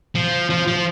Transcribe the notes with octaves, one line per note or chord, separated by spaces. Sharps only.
F3
F3
F3